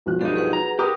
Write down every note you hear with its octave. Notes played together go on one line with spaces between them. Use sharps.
B1 F3 F#6
G2 D#4 G4 A4
G#4 B4 F#5
A#5
G4 A#4 A#5 B5 D#6